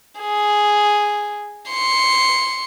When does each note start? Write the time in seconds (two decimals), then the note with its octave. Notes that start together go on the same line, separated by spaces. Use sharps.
0.21 G#4
1.70 C6 C#7